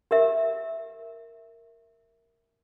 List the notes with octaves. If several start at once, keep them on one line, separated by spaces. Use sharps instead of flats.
G4 A#4 E5